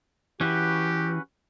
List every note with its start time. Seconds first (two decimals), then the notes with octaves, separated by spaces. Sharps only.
0.41 E3 C#4 F#4 G4 B4